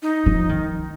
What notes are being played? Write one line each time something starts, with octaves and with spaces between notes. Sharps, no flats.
D#4
F3
D#3